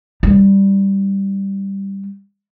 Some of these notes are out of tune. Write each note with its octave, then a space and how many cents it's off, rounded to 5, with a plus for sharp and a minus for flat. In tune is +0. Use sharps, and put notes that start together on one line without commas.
G3 +0 D#4 -15